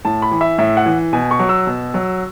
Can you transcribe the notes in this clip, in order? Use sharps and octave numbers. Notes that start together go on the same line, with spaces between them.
A2 A5
B5
E3
E5
A2 E5
F#5
E3
B2 G#5
C#6
F#3
E6
B2
F#3